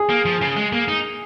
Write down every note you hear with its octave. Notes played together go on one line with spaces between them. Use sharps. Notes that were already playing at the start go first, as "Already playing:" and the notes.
Already playing: G#4
A#3
F3
C#3
G#3
A#3
D#4